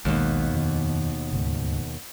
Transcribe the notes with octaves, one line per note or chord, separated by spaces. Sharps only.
A#1 D#2 B2 D#3 G#3
F2 D#3
D2 G#2 C#3